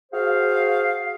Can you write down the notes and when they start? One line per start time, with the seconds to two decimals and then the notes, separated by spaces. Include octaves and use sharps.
0.12 F#4 G#4 C5 F5